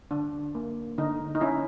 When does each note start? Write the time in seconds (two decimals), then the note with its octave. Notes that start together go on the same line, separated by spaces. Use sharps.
0.11 D3 D4
0.55 A#3
0.98 D3 D#4
1.35 D#4
1.41 C#4 E4